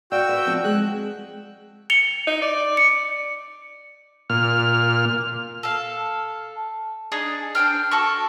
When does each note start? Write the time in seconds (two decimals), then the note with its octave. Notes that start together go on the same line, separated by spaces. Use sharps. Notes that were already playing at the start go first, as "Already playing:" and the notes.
0.12 F#4 D5 F5 G5 E6
0.29 B4 E5
0.46 F3 C4 F4
0.64 G#3 G#4 F#6
1.90 C#7 F7 G7
2.27 D#4
2.42 D5
2.77 C#7
4.30 A#2 F6
5.63 A4 F5
7.12 D4 D#4 G#4 D#6
7.55 D4 C5 G5 F6
7.91 F#4 A4 C#6